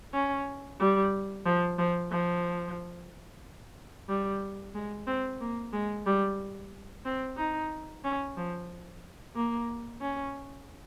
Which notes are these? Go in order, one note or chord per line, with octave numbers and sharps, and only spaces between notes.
C#4
G3
F3
F3
F3
G3
G#3
C4
A#3
G#3
G3
C4
D#4
C#4
F3
A#3
C#4